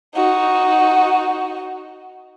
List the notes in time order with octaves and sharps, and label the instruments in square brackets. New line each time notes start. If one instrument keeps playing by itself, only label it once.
[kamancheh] D#4 F#4